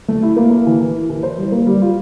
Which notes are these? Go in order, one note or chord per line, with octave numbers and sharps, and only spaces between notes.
A3
E4
A#3
A#3
E3
E3
E4
E3
C5
G3
A#3
G3
F4